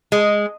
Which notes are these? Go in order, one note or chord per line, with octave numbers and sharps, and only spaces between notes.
G#3